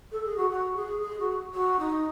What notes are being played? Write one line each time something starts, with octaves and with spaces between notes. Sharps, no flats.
A4
G#4
F#4
F#4
G#4
G#4
F#4
F#4
D#4